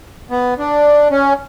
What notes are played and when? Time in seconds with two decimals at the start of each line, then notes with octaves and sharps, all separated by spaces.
0.30 B3
0.58 D4
1.11 C#4